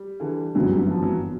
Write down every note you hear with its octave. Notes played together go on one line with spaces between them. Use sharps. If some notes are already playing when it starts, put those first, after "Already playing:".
Already playing: G3
D3 E3
G1 F#2 D3 E3 F#3
G3
E3 F#3
F3
E3 F#3